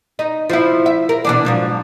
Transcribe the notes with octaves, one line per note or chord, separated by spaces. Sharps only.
D#4
F3 E4
E5
A#4
B2 E3 D4
G#2 F3 F#3